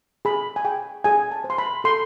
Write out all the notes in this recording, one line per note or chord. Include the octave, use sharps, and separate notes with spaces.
G#4 B5
G#5
G#4 G5
G#4 G#5
A5
C5
C6
B5
A4 C6